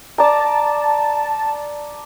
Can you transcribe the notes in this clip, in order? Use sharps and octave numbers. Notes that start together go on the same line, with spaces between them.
D5 A5 A#5